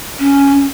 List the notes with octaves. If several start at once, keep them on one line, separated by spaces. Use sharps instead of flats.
C#4